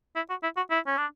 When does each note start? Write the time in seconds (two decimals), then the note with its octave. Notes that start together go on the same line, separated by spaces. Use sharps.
0.16 E4
0.30 F#4
0.43 E4
0.57 F#4
0.70 E4
0.87 C#4
0.98 D4